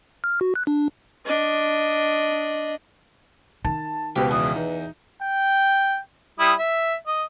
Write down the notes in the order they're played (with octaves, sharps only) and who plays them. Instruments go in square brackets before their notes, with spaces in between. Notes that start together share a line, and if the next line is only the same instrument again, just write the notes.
[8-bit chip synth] F6
F#4
F#6
D4
[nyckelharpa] D4 D#5
[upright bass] D#3 [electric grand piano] A5
[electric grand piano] C#2 B2 B4 [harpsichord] G4 [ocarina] C5
[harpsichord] E2 [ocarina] D#6
[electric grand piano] D#4 [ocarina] B4
[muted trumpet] G5
[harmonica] G3 E4 D#6
E5
D#5